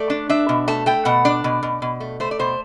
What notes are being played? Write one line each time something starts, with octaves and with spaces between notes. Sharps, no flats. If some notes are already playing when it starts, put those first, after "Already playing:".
Already playing: A3 D5
D4
D4 E5
B2
A3 A5
A3 G5
B2 F#5
D4 D5
B2
B2
B2
A3
A3 C5
D5
B2 C5